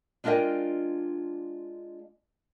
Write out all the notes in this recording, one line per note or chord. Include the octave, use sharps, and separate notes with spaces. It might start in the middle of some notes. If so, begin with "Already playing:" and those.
G#3 D4 F4 A#4 D#5 G5